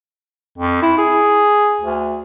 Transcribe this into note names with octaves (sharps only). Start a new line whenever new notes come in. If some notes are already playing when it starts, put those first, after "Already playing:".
F2
E4
G#4
D2